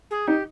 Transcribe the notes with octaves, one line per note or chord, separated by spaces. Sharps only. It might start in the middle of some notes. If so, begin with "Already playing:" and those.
G#4
D#4 G4